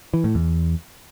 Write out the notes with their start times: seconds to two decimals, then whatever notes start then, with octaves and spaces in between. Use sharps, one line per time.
0.14 E3
0.24 A2
0.35 E2